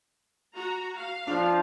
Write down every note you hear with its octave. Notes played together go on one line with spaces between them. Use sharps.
F#4 A#5
F5
F3 D4